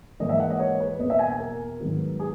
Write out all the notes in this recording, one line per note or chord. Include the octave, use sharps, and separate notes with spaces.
G#2 E3 A#3 D#5
E5
F#5
D#5
C#5
B4
E2 B2 A#3 D#5
E5
G#5
G#5
A#4
G#2 D#3 F#3 B3
G#4